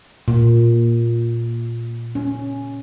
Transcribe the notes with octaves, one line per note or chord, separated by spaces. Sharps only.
A#2
C#4